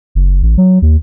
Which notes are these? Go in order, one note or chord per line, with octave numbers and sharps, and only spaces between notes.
F#1
A1
F#3
D#2